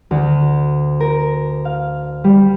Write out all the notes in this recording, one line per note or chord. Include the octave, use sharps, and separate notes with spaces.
D2
A#4
F5
G3